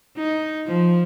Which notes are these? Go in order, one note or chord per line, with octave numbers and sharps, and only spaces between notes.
D#4
F3